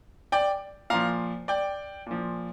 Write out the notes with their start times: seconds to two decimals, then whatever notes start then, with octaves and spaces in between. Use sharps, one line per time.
0.32 D5 G5
0.90 A#2 F3 F5 A#5
1.48 D5 G5
2.07 A#2 F3